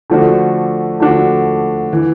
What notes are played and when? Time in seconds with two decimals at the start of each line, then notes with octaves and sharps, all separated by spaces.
0.10 D3 F3 A3 D4 F#4
1.00 D3 F3 A3 D4 F#4
1.93 E3